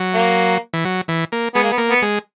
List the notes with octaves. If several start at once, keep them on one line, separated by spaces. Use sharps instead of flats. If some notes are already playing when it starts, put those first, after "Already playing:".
Already playing: F#3
A#3
E3
F#3
E3
A#3
G#3 B3
A#3
B3
A#3
B3
G#3